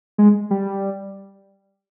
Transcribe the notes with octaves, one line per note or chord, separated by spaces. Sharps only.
G#3
G3